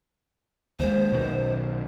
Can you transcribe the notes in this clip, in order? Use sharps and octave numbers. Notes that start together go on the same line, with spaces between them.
D#2 G#3 C5
B1 B2 D#3